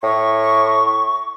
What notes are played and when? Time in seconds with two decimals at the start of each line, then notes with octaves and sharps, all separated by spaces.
0.03 A2 C#6